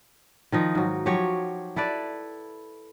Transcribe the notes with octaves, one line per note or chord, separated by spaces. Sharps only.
D#3 F3 D#4
G#2 F#3
F3 F#3 G4 C#5
E4 A4 B4 D5